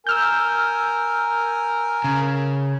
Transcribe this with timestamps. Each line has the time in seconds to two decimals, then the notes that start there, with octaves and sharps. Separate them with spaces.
0.07 A#4 G#5 E6 F6 G6
2.04 C#3